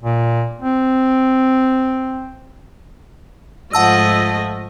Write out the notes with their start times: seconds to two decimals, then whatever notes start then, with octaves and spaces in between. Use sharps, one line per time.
0.03 A#2
0.62 C4
3.73 G#2 F3 A3 F4 D#5 F#5 A5 E6